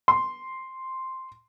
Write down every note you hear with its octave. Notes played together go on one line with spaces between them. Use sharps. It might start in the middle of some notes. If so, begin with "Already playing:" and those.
C6